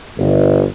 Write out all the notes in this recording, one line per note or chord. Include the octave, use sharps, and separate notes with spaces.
G1